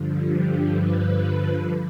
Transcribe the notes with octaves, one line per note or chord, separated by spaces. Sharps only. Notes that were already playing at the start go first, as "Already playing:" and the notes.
Already playing: G2 D3 F3
G4
B4